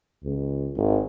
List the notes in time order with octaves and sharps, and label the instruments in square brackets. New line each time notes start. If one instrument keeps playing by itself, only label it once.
[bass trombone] C#2
G#1